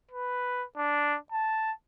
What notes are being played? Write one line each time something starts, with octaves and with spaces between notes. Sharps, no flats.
B4
D4
A5